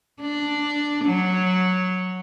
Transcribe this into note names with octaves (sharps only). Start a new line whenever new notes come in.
D4
F#3